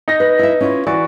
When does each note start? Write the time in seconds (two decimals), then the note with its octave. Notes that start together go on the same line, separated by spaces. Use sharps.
0.08 D#4 A#6
0.20 B4
0.39 E4 E5
0.61 C#4 E4 F4
0.87 E3 F#4 D5